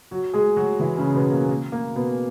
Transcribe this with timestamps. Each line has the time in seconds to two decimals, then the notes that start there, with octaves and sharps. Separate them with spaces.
0.11 F#3 F#4
0.34 G#3 G#4
0.57 F#3 F#4
0.80 E3 E4
0.97 C#3 C#4
1.15 B2 B3
1.32 A#3
1.49 A#3
1.72 A#3
1.95 B2 B3